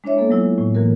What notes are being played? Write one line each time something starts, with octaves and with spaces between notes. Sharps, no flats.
G#3 D4 E4 C#5 E5
A#3 B3 A4
F#3 G#3 E4 F4
A2
E3 A#3 F#4 A#4